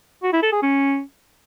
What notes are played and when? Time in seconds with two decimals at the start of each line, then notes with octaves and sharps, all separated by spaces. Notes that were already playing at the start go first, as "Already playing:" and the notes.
0.23 F#4
0.33 E4
0.43 A4
0.53 G#4
0.62 C#4